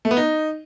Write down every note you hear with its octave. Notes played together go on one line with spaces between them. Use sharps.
A3
B3
D#4